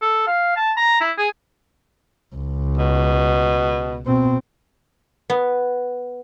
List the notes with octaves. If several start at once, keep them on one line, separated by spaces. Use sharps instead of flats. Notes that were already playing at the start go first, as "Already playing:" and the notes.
A4
F5
A5
A#5
E4
G#4
C#2
B2
B2 C4
B3